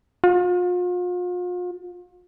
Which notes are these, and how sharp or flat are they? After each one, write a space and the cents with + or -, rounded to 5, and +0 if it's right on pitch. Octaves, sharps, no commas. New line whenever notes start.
F4 +40